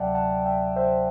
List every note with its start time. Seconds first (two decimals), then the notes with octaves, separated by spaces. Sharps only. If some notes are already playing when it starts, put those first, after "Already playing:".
Already playing: D2 C3 F#3 D5 E5 F#5 G5 A5
0.14 F#5 A5
0.45 E5 G5
0.76 C5 E5